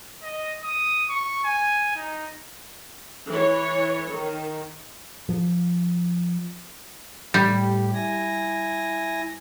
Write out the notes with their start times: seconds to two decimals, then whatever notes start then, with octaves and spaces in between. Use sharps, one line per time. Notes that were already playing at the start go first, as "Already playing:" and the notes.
0.23 D#5
0.63 D#6
1.09 C#6
1.44 G#5
1.96 D#4
3.29 E3 C#5
4.12 D#3
5.29 F3
7.34 A2 G3 G4
7.94 E4 G#5 A#6